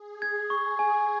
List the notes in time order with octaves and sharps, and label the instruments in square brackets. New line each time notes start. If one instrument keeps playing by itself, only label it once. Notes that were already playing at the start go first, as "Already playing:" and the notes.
Already playing: [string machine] G#4
[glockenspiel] G#6
C#6
G#5